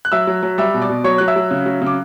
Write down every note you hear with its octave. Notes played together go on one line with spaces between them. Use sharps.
F#6
F#3 E5 E6
F#3
F#3
G3 E5 E6
B2
D5 D6
B2
F#3 C#5 C#6
F#3 F#6
E5 E6
F#3
C#3
F#3
C#3 D6